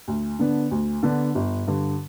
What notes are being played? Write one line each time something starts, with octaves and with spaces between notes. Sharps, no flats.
D2
D3 B3 D4
D2
D3 B3 D4
G1
G2 D3